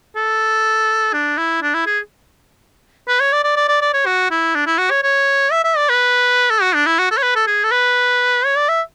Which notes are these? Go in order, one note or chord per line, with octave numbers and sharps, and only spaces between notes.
A4
D4
E4
D4
E4
G#4
B4
C#5
D5
D5
D5
D5
D5
C#5
F#4
E4
D4
E4
F#4
C#5
C#5
E5
E5
D5
B4
A4
F#4
D4
E4
F#4
A4
C#5
B4
A4
G#4
A4
B4
C#5
D5
E5